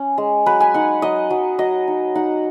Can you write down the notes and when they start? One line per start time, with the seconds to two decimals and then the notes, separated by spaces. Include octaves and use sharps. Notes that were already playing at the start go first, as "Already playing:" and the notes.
Already playing: C#4
0.18 G#3
0.46 F#3 B4
0.60 G#5
0.74 D#4 F#5
1.02 F#3 D#5
1.30 F#3
1.59 F#3 D#5
1.88 D#4
2.15 D#4 F#5